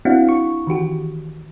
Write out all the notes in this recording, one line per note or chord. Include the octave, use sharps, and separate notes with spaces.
C4 D4 E4 F#4 F5 F#5
C#6
D#3 E3 F#4 G4